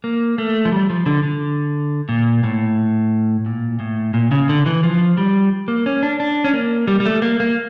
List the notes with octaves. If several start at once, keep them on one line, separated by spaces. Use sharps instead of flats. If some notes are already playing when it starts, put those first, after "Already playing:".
A#3
A3
F3
G3
F3
D3
D3
A#2
A2
A#2
A2
A#2
C#3
D3
E3
F3
G3
A#3
C#4
D4
D4
C#4
A#3
G3
G3
A3
A#3
A#3